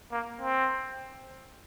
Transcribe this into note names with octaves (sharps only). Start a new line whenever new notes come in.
A#3
C4